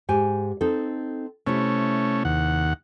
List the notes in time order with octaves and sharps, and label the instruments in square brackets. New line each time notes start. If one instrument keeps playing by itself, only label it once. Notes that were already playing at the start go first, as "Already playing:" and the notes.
[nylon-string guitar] G#2 G4 G#5
C4 D#4 A4
[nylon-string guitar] C3 E4 [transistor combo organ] A3 C#4
[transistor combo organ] D#2 F#5